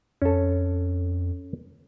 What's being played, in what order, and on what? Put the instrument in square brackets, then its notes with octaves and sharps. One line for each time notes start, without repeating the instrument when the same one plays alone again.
[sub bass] F2 [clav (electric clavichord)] C#4 A4